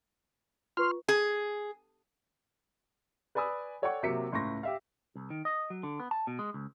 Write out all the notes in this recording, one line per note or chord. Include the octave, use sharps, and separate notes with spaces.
F4 B4 C6 C#6 F6
G#4
B4 D5 G#5 B5 D#6 E6
A4 C#5 D5 F#5 G5 C#6
C3 F#3 A#3 E5 B6 C#7
C#2 A2 C6 C#6 A#6
G4 E5 F5
C2
D#3
D#5
F#3
D3
B3
A5
B2
G#3
C#2